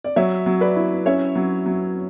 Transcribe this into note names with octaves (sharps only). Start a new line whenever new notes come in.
D5
F#3 C#5 E5
F#3
B4 D5
E4
C#4 C#5 E5
F#3
F#3